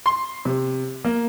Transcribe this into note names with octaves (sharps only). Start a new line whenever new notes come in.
C6
C3
A#3